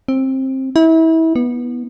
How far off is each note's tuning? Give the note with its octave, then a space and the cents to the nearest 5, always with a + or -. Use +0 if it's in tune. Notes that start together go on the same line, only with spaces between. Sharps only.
C4 +20
E4 -30
B3 -15